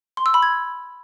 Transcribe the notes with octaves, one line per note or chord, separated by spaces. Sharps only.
C6
E6
B5
G#6